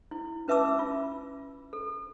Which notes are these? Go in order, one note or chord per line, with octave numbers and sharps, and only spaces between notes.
E4
C#4 B4 E5 A5 D6 E6
F4
A4